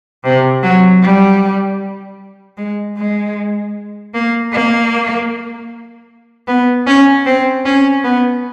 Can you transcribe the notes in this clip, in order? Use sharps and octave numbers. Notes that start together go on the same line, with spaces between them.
C3
F#3
G3
G#3
G#3
A#3
A#3
B3
C#4
C4
C#4
B3